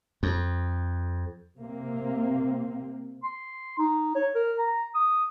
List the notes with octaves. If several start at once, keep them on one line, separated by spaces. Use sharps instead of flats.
F2
C3 A#3 C4
C6
D#4
C#5
A#4
A#5
D#6